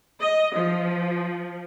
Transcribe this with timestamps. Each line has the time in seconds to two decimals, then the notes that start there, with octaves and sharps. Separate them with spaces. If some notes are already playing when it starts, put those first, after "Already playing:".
0.21 D#5
0.56 F3